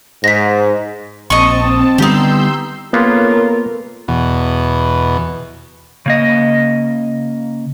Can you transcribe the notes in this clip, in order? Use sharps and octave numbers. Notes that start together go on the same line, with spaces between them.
G#2 A#6 B6
A#1 C4 D#5 A5 C#6
D3 G3 B3 D#4 G4 C6 E6 G6
C#3 A#3 B3 F4 A4 A#4
E2 B2
C#3 A#3 D#5